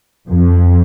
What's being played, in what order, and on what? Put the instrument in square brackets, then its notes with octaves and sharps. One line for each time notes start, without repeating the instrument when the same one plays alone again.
[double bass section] F2